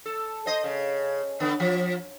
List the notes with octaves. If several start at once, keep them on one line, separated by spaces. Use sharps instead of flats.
A4
C5 D#5
C#3
D3 B3
F3